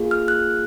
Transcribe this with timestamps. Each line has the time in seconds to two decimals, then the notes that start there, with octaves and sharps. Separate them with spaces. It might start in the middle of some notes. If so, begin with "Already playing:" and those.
Already playing: A#3 F4 G#4
0.11 F6
0.28 F#6